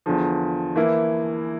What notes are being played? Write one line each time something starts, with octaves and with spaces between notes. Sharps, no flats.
E2 D3 F3
E3 A#3 E4